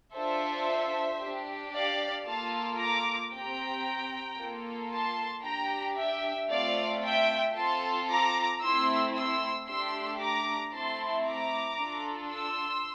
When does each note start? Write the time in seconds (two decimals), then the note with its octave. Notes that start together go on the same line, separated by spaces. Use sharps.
0.14 D4 F4 A4 C5 E5
1.21 D4 G4
1.73 D5 F5
2.26 A#3 F4 A4 F5 A5
2.79 A#5 D6
3.32 C4 G4 G5 A#5
4.38 A#3 F4 A4
4.91 A5 C6
5.44 D4 G4 G5 A#5
5.97 E5 G5
6.49 A3 C4 F4 D5 F5
7.03 E5 G5
7.56 C4 F4 A4 A5 C6
8.08 A#5 D6
8.61 A3 C4 E4 C6 E6
9.15 C6 E6
9.67 A3 D4 G4 C6 E6
10.20 A#5 D6
10.73 A3 C4 E4 A5 C6
11.26 A#5 D6
11.79 D4 F4 A4
12.32 C6 E6